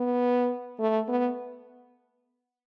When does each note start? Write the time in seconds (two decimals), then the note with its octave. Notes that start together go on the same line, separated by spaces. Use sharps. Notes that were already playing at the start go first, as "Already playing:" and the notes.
Already playing: B3
0.79 A3
1.09 B3